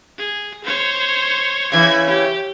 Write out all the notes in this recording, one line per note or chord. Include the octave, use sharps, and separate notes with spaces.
G#4
C5 C#5
C#3 E3 G#6
G4